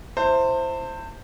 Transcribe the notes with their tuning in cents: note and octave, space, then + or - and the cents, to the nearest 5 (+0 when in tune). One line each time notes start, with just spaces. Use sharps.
E4 +0 C5 +0 A5 +40